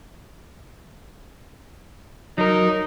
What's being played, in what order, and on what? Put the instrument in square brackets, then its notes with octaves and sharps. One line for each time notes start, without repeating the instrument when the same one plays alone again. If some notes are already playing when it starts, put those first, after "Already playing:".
[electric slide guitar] F#3 A#4 [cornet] D#4